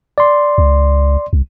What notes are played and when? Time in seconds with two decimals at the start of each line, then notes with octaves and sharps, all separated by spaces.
0.18 D5 C6
0.58 C#2
1.33 C2